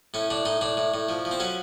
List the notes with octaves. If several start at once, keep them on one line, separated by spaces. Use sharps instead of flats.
A2 C#4
A2 D4
A2 D#4
A2 D4
A2
A2
F3
F3
C4
F#3 C#4